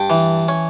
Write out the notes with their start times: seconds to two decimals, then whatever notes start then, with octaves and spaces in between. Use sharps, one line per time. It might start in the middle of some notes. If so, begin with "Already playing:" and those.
Already playing: G2 G5 A5
0.10 E3
0.48 C#4